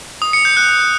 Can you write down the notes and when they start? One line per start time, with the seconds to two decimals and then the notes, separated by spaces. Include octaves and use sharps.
0.22 D#6
0.33 C#7
0.45 G6
0.57 F#6